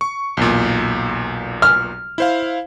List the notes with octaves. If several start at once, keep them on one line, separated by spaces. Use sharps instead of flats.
C#6
B1 E2 A#2
F6
E4 C5 F5